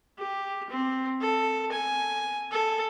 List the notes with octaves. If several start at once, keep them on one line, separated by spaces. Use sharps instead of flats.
G4
C4
A4
G#5
A4